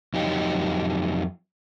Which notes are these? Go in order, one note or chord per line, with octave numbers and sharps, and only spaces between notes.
F2 F#3 D#4 G4